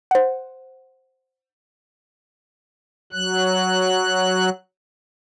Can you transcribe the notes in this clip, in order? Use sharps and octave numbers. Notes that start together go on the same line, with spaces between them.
C5 F#5
F#3 F#6